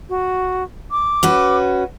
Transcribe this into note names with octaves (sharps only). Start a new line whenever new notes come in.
F#4
D6
C#4 F#4 B4